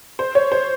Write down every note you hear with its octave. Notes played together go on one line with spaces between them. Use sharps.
C5
C#5
C5